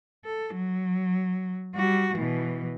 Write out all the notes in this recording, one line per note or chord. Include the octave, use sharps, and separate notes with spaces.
A4
F#3
G3 F#4
B2 E3